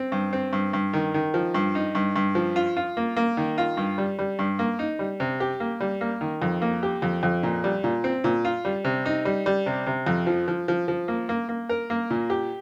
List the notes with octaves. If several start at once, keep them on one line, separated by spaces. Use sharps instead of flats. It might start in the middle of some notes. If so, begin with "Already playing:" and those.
Already playing: C4
G2
C4
G2
G2
D#3
D#3
F3
G2
D#4
G2
G2
F3
F4
F4
A#3
A#3
D#3
F4
G2
G3
G3
G2
A#3
D#4
G3
C3
G4
A#3
G3
A#3
D#3
F2
A#3
G4
F2
F2
A#2
G3
A#2
C4
A#2
F4
G3
C3
D#4
G3
G3
C3
C3
F2
F3
F3
F3
F3
A#3
A#3
A#3
A#4
A#3
A#2
G4